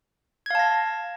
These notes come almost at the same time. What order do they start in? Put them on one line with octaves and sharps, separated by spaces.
G#6 F5 A5 A#6